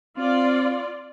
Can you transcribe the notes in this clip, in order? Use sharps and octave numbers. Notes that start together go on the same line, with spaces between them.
C4 F4 D5